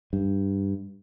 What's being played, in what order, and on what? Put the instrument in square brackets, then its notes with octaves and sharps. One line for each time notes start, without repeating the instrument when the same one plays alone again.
[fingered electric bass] G2